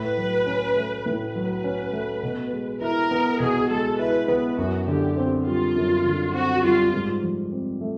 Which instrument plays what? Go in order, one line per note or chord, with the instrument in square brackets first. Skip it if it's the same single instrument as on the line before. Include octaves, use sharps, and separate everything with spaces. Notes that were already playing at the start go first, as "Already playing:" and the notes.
Already playing: [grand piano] A2 [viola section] B4
[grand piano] F#3
C#4
A3
[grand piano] A2 [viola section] B4
[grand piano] F#3
C#4
A3
B2
G#3
[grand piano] E4 [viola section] A#4
[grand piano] B3
[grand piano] B2 [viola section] G#4
[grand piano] G#3 [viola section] A4
[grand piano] E4 [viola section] B4
[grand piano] B3 [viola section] B4
[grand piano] F#2 [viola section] F#4
[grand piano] D3 [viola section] G4
[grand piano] C4
[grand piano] G3 [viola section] F4
[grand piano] F#2
D3
[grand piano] C4 [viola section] F#4
[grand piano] G3 [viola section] F4
[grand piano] G#2
F3
C4
A3